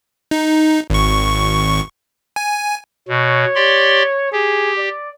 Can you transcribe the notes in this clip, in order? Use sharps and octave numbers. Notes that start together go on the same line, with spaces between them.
D#4
G#1 C#6
G#5
B2 C#5
G4 D5 C6
G4 G#4
D5